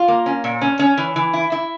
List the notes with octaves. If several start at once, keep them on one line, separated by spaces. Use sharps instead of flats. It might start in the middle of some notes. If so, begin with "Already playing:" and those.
Already playing: F4
A#3
C#4
A#2
C#4
C#4
E3
E3
E4
E4